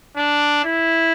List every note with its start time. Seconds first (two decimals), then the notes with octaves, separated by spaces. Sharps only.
0.17 D4
0.64 E4